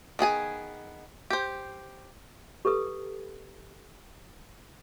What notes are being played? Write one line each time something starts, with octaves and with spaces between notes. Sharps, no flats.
D#3 B3 G#4 G#5
G4 C5
G4 A4 B4 D#6